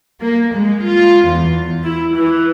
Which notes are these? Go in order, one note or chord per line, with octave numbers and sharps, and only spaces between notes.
A#3
G#3
F4
E2
E4
E3